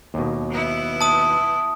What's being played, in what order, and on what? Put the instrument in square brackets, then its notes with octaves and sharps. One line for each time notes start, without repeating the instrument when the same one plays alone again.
[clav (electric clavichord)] D#2 B2
[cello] B3 E4
[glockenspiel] A5 D#6